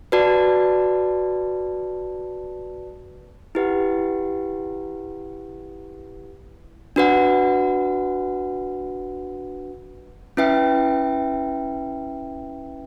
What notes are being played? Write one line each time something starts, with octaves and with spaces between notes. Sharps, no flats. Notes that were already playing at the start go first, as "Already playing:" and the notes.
F#4 B4 D5 A5
E4 G4 B4 F#5
D4 F#4 B4 F#5
C#4 E4 B4 E5 G5